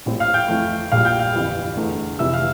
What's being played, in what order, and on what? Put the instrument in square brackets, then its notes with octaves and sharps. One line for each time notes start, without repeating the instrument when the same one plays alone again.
[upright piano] A#1 A2 G3 C4
[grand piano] F5 F6
G5 G6
[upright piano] F2 E3 A3
[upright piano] A#1 A#2 G3 [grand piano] F5 F6
[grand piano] G5 G6
F5 F6
[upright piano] G1 F2 E3 G3
E2 D3 A3
[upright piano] F1 F2 E3 G3 [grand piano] E5 E6
[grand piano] F5 F6